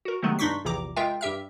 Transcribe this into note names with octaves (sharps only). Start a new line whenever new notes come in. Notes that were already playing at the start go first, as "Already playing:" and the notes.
F#4 A#4
C3 D#3 F#3 G#3 A3 B3
G2 D4 D#4 C6 C#6 B6
A#1 E2 C3 E3 A#5 D6
G#3 F4 A#4 E5 G5
G2 G4 E5 F6